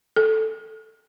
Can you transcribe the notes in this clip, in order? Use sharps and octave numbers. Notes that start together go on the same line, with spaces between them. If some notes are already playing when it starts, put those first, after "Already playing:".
A4